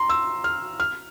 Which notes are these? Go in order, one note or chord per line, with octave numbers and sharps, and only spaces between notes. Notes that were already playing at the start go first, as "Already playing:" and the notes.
Already playing: A#5 C6
E6
F6
F6